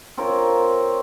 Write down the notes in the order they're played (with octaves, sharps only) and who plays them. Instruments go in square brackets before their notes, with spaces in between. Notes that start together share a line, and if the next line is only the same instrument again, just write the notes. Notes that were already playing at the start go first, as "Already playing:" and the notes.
[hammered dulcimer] C4 F4 A#4 C#5